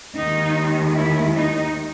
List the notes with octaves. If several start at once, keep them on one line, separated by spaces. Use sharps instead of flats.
D#2 D#3 G#3 D#4
E4
D#4